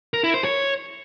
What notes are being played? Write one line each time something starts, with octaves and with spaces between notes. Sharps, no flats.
A#4
E4
C5
C#5